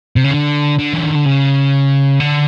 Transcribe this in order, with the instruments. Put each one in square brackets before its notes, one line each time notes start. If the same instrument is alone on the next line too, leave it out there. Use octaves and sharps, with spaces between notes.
[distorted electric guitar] C3
C#3
D3
D3
E3
D#3
D3
C#3
D3